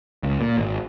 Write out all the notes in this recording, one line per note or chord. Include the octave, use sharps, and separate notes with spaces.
C#2
A#2
G#1